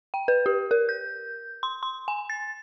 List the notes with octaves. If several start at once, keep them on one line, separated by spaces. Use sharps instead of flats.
G5
B4
G4
A#4
G6
C6
C6
G#5
A6